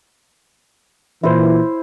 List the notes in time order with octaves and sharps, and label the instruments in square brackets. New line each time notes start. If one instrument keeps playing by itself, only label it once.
[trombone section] A#2 E3 [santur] E4 C5